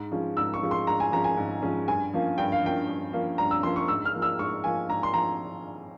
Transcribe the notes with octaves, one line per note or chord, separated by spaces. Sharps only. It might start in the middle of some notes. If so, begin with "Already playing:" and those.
Already playing: G#2
F3 G#3 C#4
G#2 E6
C#6
F3 G#3 C#4
C6
G#2 A#5
G#5
F3 G#3 C#4 A#5
G#5
G#2
F3 G#3 C#4
G2 G#5
F3 A#3 C#4
G2 G5
F5
F3 A#3 C#4 G5
G2
F3 A#3 C#4
G2 A#5
E6
F3 A#3 C#4 C6
C#6
G#2 E6
F6
F3 A#3
E6
G#2 C#6
F3 A#3 G#5
G#2 A#5
C6
F3 A#3 A#5